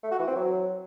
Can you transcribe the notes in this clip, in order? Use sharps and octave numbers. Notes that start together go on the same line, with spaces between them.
A3
F#4
E3
C4
F#3